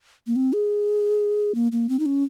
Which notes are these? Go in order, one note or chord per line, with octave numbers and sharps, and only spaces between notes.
A#3
C4
G#4
A#3
A#3
C4
D#4
C#4